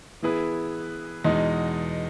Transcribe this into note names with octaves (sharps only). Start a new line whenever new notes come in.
E3 B3 E4 G#4 B4
E2 B2 G#3 D#4